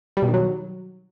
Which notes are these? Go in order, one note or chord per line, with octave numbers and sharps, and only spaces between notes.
G3
B2
D#3
F#3